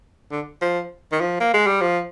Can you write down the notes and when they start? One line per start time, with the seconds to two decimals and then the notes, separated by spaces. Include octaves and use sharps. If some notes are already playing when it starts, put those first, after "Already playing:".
0.31 D3
0.61 F3
1.12 D#3
1.21 F3
1.40 A#3
1.54 G#3
1.67 G3
1.81 F3